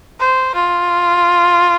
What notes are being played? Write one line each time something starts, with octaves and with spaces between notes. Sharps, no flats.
C5
F4